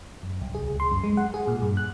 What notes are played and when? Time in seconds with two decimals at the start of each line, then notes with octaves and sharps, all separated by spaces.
0.23 F#2
0.41 C2
0.55 G#4
0.68 C#2
0.80 C6
0.92 F#2
1.04 G#3
1.17 F#5
1.34 G#4
1.48 A#2
1.62 G2
1.77 F#6